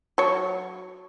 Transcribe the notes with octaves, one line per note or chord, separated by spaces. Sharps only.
F#3 C#5